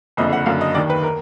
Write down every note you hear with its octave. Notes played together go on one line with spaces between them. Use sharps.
F#1 F2 D3 D#5
F#5
F#1 F#2 D3 F5
D#5
D#2 D#3 D5
B4
A#4